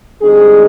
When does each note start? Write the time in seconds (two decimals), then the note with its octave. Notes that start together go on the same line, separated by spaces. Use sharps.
0.21 D3 G3 C4 D#4 G#4